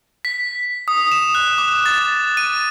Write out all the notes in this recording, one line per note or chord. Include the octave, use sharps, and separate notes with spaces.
B6
D#6
E7
F#6
D6
A6
D#7